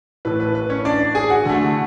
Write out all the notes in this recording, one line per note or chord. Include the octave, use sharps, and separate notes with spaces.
A2 E3 A3 B4
B4
B4
C#4 C#5
D4 D5
G#4 G#5
F#4 F#5
D3 A3